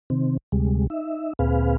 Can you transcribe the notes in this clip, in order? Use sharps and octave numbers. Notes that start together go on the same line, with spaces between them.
C3 D#3 C4
D2 C3 G3 G#3
D#4 E5
D2 A#2 C4 G#4 B4 F5